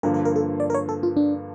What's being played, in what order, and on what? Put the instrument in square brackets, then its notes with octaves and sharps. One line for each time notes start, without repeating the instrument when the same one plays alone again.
[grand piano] G2 D3 F3 A#3 [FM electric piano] A#4
[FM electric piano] A#4
A#4
A4
D5
A#4
C#5
A4
F4
D4